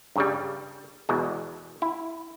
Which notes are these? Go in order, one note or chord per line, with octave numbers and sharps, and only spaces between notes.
G2 C#3 G3
E2 B2 G#3
E4